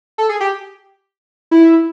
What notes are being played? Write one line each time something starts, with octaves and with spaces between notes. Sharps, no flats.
A4
G#4
G4
E4